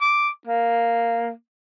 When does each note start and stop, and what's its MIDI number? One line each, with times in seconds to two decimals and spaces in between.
0.01 0.29 86
0.47 1.30 58